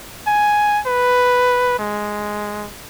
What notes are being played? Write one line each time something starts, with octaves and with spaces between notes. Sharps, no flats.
G#5
B4
G#3